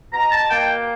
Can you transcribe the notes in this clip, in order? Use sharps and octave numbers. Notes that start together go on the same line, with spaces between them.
B2 A#5
A5
A#3 G5